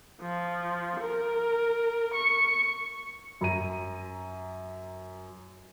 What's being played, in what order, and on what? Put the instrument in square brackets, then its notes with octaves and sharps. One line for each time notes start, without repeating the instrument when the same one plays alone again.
[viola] F3
A#4
C#6
[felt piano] F#2 A#5 D#7